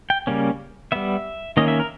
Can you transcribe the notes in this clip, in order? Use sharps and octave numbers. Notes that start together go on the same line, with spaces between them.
G5
C#3 G3 A#3 C#4
G3 B3 E5
D#3 A#3 C#4 D#5
E5
A#4